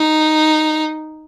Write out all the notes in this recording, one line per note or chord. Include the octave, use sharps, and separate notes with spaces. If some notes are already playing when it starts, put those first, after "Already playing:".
Already playing: D#4